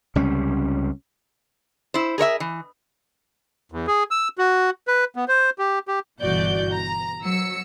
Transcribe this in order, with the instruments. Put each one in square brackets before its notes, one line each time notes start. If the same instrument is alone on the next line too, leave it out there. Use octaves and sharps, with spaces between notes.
[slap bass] C#2 C3 G3 C#4
[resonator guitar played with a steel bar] E4 C5
G#4 A#4 C#5 E5
E3
[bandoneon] E2
G#4
E6
F#4
B4
B3
C5
G4
G4
[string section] G1 B2 E3 F#4 D5 G6
A#5
F#3 E6 C#7